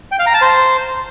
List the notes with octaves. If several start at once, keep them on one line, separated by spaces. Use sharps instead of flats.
G5
F5
A#5
A5
C5